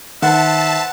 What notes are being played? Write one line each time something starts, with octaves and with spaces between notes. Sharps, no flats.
D#3 B4 C5 E5 F#5 A5